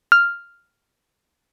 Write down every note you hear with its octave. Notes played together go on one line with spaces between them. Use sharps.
F6